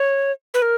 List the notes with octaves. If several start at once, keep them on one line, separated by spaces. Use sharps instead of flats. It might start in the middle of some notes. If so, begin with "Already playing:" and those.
Already playing: C#5
B4
A#4